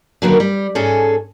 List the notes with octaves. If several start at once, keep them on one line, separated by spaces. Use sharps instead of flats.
D3 D#3 F#3 A#3 B3 A#4
G3
G#2 C#4 G#4 A4